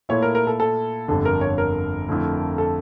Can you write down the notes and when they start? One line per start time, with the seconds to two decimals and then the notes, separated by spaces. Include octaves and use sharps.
0.09 A#2 A3 E4 C#5
0.22 A#4
0.35 A#4
0.47 A4
0.60 A4
1.08 G1 F2 D3 A4
1.25 A#4
1.41 C#5
1.58 A#4
2.08 F2 D3 A3 E4
2.58 A4